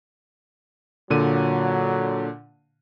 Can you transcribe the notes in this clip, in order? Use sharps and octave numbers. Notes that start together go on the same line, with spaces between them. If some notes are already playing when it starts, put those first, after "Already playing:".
A#2 D3 F#3 D#7